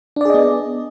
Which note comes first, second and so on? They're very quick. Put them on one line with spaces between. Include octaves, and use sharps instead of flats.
D4 D5 G#4 D#5 B3